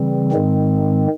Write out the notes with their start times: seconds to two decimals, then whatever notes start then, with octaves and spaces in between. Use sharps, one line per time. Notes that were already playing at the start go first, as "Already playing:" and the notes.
Already playing: C#3 E3 G3 C4
0.32 G#2 D#3 G#3 C4